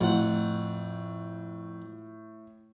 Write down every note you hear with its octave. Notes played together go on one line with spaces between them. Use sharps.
F2 A2 F#5